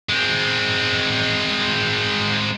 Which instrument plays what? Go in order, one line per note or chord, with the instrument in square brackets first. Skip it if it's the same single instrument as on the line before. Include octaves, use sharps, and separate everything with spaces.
[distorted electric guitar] G#3 C4